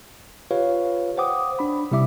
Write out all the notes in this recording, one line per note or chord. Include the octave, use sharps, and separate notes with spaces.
F4 G4 B4 C#5 F5
C5 F#5 G5 D6 D#6
D4 B5
C3 G3 E4 E5 D6